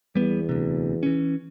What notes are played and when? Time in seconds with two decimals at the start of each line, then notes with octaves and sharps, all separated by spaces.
0.15 E2 G3 B3
0.49 D2 C3
1.03 E3 C#4